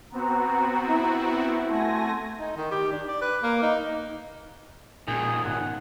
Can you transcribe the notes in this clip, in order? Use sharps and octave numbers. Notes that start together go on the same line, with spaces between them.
B3 C4 F#4 A#5
E4
A3 F#5 G#5 A5 C6 A#6
D#4
D#3
G4
D4
D5
B4
A#3
D#4
C#2 A#2 D#3 G#4
G#2 C#3 B3 F#5